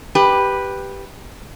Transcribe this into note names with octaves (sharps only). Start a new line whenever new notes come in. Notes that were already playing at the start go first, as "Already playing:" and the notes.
G4 B4